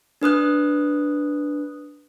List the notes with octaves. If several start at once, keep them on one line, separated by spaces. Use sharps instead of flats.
D4 B4 D#6 F#6